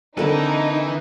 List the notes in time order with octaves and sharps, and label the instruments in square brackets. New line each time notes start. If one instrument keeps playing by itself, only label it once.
[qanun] D3 A#3 C4 [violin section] D#4 [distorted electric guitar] E4 B4 [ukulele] A4